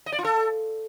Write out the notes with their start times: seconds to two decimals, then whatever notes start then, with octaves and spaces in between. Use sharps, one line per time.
0.06 D#5
0.12 D5
0.18 F4
0.24 A4